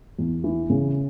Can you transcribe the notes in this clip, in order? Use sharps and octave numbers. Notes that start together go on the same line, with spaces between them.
E2
E3
C#3